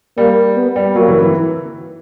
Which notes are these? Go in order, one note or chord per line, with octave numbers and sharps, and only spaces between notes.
G3 A#3
B3
G3
F#3 A#3
E3
E3